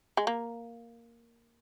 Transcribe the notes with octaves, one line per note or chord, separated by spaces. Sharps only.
G#3
A#3